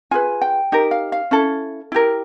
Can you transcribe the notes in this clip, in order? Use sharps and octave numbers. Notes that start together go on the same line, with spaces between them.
F4 G#4 B4 G#5
G5
D#4 G4 A#4
F5
F5
C#4 E4 A4
E4 G4 A#4